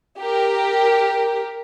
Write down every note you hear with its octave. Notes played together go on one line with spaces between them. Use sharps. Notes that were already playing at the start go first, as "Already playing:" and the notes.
G4 A#4